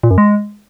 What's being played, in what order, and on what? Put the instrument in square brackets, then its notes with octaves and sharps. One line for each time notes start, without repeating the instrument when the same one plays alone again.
[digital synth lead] A#2
F#2
G#3